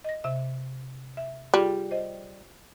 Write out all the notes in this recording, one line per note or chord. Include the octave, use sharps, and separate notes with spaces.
D#5 A#6
C3 E5
E5
G3 F4 G#4
C5 D#5